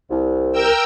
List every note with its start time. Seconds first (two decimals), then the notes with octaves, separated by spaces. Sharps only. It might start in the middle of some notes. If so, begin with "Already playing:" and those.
0.11 C2
0.52 A#4 G5 E6